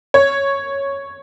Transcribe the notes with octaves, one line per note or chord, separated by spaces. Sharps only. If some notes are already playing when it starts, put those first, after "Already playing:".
C#5